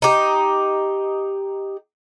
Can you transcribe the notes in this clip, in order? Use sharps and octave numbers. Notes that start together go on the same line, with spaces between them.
D#4 G4